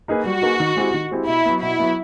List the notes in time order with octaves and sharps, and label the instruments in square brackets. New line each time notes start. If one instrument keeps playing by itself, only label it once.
[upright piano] A#3 D#4 G#4 B4
[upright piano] G3 [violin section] F#4
[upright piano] A#3 D#4 G#4 B4
D#3
G#3 C4 E4 G4
D#3
G#3 C4 E4 G4
[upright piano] B2 [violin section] E4
[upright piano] F#3 B3
[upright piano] B2 [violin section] E4
[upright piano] F#3 B3